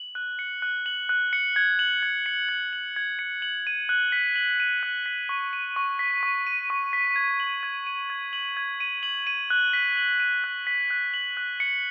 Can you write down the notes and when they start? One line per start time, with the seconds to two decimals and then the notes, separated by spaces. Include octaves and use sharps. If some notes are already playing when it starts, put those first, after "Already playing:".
Already playing: F#7
0.15 F#6
0.39 C#7
0.62 F#6
0.86 F#7
1.09 F#6
1.33 C#7
1.56 G#6
1.79 F#7
2.03 G#6
2.26 C#7
2.49 G#6
2.73 F#7
2.96 G#6
3.19 C#7
3.42 F#7
3.67 D#7
3.89 F#6
4.12 B6
4.36 F#7
4.60 D#7
4.83 F#6
5.06 B6
5.29 C#6
5.53 D#7
5.76 C#6
5.99 B6
6.23 C#6
6.47 D#7
6.70 C#6
6.93 B6
7.16 G#6
7.40 F#7
7.63 G#6
7.87 D#7
8.10 G#6
8.33 F#7
8.57 G#6
8.80 D#7
9.03 F#7
9.27 D#7
9.50 F#6
9.73 B6
9.97 F#7
10.20 D#7
10.44 F#6
10.67 B6
10.90 F#6
11.14 F#7
11.37 F#6
11.60 C#7